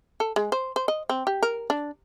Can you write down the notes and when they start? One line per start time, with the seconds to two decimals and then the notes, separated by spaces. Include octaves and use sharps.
0.20 A4
0.36 G#3
0.52 C5
0.76 C5
0.88 D#5
1.09 C4
1.27 G4
1.43 A#4
1.70 D4